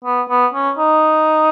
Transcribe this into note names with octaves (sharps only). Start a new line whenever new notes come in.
B3
B3
C#4
D#4